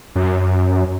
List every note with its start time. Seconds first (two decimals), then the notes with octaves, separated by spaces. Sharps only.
0.16 F#2